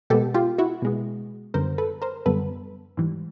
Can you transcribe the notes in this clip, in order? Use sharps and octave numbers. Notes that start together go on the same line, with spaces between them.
B2 G#3 B3 G4 A4
F4 G4
E4 F#4
B2 G#3 B3
F#2 D3 G3 B3 A#4 C5
A4 B4
A#4 C5
F#2 D3 G3 B3 A4 B4
G#2 E3 G3